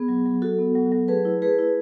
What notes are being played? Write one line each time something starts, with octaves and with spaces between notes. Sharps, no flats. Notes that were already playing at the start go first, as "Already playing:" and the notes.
Already playing: B3 G#4
F#3
F#3
F#4 A4
B3
F#3
F#3
A3 G#4 B4
E4
A3 G#4 B4
E4